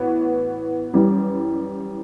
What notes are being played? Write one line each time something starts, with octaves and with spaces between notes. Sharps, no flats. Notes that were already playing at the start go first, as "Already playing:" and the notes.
Already playing: A2 E3 B3 F#4
F#2 E3 G3